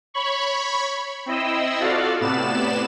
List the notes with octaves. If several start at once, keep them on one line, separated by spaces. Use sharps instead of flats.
C#5 B5 C#6
C4 E4 D#5 E6
F4 F#4 A4 D5 F5
A2 C3 B3 D5 E7